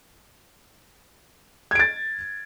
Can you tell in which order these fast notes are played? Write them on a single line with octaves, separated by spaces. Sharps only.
G#6 D7 A6